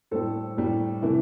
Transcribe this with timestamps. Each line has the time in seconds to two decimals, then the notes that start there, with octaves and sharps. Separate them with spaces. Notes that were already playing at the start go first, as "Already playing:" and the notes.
0.11 A2 G3 A4 C5
0.57 A2 G3
1.02 C3 E3 A3 E4